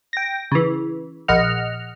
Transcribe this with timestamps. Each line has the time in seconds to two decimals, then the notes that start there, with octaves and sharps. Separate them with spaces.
0.13 G5 A#6
0.52 C#3 E3
1.28 A#1 D#5 F#5 F6